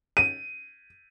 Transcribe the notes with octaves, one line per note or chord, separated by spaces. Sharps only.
D#7